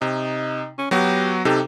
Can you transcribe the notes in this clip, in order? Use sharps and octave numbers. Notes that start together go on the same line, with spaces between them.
C3 D#4
C#4
F#3 B3 F#4 G4
C3 D#4 G4 A4